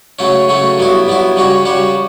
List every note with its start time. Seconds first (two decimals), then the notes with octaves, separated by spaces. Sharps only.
0.19 C#3 F#3 A3 C#4
0.48 C#3 F#3 A3 C#4
0.78 G2 F#3 B3 E4
1.07 G2 F#3 B3 E4
1.36 C#3 G3 C#4 F#4
1.65 C#3 G3 C#4 F#4